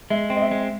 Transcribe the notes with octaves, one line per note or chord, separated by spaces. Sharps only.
G#3 E5
C4
D#5
E5
G#3